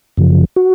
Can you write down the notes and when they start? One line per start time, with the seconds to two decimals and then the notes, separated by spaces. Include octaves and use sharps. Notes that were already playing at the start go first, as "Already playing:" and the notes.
0.17 F#2 C#3 F3
0.56 F#4